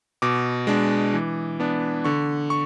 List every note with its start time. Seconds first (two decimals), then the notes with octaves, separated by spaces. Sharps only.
0.22 B2 D6
0.67 G#3 D4
1.13 E3
1.60 B3 D4
2.04 D3 C#6
2.50 C#6